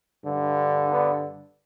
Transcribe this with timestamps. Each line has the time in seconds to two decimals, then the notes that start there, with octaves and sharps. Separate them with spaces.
0.23 G2 D3
0.90 B3 D4